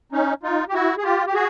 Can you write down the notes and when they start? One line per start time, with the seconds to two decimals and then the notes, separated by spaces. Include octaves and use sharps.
0.12 C#4 D#4
0.43 D#4 F4
0.69 G4
0.74 E4 F#4
0.98 G#4
1.04 F4 G4
1.27 G4
1.34 F#4 G#4